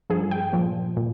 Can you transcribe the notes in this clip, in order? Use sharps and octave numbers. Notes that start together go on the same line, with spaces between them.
G2 F3 G#4
G5
A#2 F3
A#2